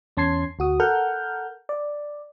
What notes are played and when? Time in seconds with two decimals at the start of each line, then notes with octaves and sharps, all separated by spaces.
0.17 E2 C#4 A5 C6 G#6 C7
0.59 D2 F#4 D#6
0.80 A4 A#4 F#5 F6 G6
1.69 D5